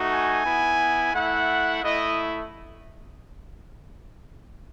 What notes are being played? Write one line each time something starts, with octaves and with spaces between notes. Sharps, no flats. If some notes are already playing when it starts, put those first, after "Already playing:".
Already playing: A3 D#4 F#4
G#5
B3 E4
A3 E4 F#5
A3 E4 D#5